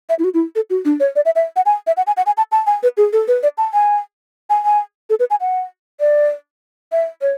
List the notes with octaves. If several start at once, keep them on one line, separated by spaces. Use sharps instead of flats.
E5
E4
F#4
E4
A4
F#4
D4
C#5
D5
E5
E5
F#5
G#5
E5
F#5
G#5
F#5
G#5
A5
A5
G#5
B4
G#4
A4
B4
D5
A5
G#5
G#5
G#5
A4
B4
G#5
F#5
D5
E5
C#5